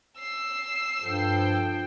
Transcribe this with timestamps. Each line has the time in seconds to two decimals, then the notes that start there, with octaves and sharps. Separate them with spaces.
0.20 E6 C7
1.03 G2 F3 A4 G5